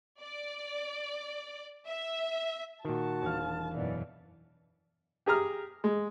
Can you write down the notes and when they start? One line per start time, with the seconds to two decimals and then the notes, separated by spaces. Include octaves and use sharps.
0.21 D5
1.86 E5
2.85 A#2 D#3 F#4 A5
3.22 E1 G3 F5
3.75 F#2 B2 E3 D5
5.26 G4 G#4 A#5 F6
5.84 G#3